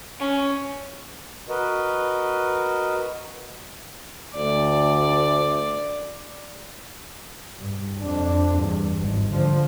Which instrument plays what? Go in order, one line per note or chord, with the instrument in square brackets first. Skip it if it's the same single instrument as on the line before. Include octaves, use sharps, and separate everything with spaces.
[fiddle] C#4
[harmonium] F#4 A#4 B4 D#5
[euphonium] D2 [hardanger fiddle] D5
[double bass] G2
F2 D4
E2 G2
G#1
D3 F3